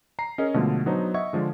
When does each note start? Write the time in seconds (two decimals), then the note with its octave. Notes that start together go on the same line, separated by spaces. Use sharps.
0.19 A#5 C7
0.38 C#4 G#4 A#4 C#5 D#5
0.54 B2 D3 F3 G#3 A3
0.86 F#3 B3 D4 D#4 C5
1.14 D#5 E5 F#5 C#6 G#6
1.33 D3 F3 G#3 D4